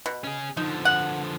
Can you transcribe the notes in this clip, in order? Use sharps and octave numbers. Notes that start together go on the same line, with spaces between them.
B2
C#4 G#4
D3 F3 D#4
F#5